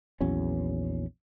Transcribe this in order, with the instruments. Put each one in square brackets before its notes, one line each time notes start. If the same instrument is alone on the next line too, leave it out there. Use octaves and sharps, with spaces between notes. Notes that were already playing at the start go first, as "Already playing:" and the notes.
[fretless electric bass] A#1 E2 F#3 C#4